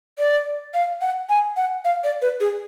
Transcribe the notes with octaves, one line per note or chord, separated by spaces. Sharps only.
D5
F5
F#5
G#5
F#5
F5
D5
B4
G#4